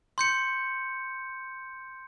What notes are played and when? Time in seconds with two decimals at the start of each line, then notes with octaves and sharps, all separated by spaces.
0.18 C6 G6 C#7